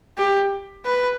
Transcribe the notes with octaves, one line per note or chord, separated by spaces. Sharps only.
G4
B4